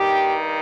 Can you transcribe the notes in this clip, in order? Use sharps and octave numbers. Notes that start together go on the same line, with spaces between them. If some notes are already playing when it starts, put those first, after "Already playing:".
Already playing: G2 D#3 G4